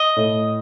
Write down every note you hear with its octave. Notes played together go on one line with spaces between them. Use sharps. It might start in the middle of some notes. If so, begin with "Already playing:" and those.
Already playing: D#5
A2